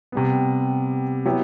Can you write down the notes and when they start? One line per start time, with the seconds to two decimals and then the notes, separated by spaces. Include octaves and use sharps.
0.12 C3 G3 B3
1.25 F#3 B3 E4 G4